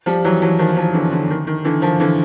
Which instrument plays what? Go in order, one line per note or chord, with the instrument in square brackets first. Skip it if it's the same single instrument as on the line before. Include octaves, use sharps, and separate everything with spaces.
[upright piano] F3 G3
E3 F#3
E3 F#3
D#3 F3
D#3 F3
D3 E3
D3
D#3
D#3
D3 E3
D#3 F3
D3 E3